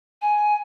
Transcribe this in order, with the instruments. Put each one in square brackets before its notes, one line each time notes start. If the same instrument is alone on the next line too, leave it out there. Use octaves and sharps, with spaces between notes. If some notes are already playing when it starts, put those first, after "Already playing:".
[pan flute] G#5